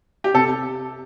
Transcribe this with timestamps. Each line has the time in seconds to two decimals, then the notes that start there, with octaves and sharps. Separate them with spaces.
0.24 G4
0.34 C3 A4